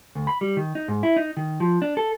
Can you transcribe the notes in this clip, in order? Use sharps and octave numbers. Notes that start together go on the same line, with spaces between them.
D2
B5
G3
D#3
D#4
G#2
E4
D#4
D#3
F3
D4
A4